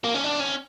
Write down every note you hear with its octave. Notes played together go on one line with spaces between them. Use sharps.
A#3
C#4
D4
C#4